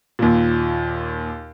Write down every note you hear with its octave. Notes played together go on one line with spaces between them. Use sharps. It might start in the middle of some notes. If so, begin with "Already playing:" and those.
D#2 A#2